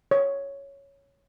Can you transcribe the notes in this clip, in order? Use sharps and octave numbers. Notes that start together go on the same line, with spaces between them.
C#5